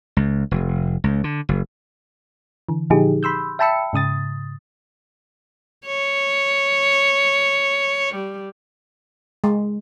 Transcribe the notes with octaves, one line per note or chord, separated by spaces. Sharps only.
C#2
F1
C#2
D3
F#1
D3 E3
A#2 D3 F3 D#4 G4 G#4
B5 C6 E6 G6
E5 G5 A5 B5 E6 C#7
G#2 C#3 D#6 A6
C#5
G3
G#3